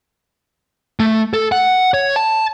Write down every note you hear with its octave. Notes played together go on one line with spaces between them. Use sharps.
A3
A4
F#5
C#5
A5